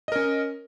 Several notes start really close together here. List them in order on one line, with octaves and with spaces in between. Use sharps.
D#5 A#4 C#4